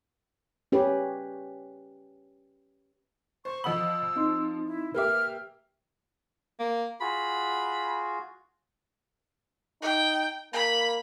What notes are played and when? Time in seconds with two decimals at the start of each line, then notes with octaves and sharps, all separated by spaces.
0.72 C#4 G4 B4 C#5
3.45 C5 C#6
3.64 F3 D#5 F#5 B5 D#6 E6 F#7
4.16 C4 D#4 C6
4.66 E4
4.94 A#3 G4 B4 E5 D6 F6
6.59 A#3
7.01 F4 F#4 G#4 B5
9.82 D#4 G5
10.53 A#3 B5